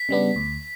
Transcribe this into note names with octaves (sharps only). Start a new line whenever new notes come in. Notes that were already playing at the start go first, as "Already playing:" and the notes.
Already playing: B6
C#3 G3 B3 D4
D2